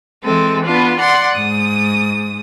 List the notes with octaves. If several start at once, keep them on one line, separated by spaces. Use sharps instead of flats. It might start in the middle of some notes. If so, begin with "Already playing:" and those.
E3 G#3 C4 A4
B3 D4 F4
D5 F#5 C6
G#2 D#6